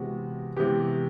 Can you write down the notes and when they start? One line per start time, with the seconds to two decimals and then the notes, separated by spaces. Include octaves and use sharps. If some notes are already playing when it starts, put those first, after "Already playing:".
Already playing: C3 E3 G#3 B3 F#4
0.56 C3 E3 G#3 B3 G4